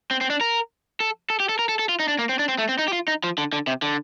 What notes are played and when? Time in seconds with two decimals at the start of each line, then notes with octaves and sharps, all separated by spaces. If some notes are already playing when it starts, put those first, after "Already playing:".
0.11 C4
0.21 C4
0.30 D4
0.41 A#4
1.00 A4
1.30 A4
1.40 G4
1.49 A4
1.59 A#4
1.69 A4
1.79 A4
1.89 F4
2.00 D#4
2.08 D4
2.19 A#3
2.29 C4
2.39 D4
2.49 C4
2.58 A3
2.69 C4
2.79 D#4
2.88 G4
2.93 F4
3.08 D#4
3.24 F3
3.38 D3
3.53 D3
3.67 C3
3.82 D3